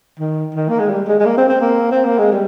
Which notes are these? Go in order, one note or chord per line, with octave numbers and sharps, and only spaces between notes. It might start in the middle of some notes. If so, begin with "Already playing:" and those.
D#3
D#3
A#3
G#3
G3
G#3
G#3
A#3
C4
C4
A#3
C4
A#3
G#3
G3